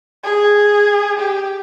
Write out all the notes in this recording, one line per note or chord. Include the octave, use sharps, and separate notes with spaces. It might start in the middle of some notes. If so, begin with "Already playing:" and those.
G#4
G4